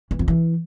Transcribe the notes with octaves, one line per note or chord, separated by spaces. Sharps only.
E3
F2
E3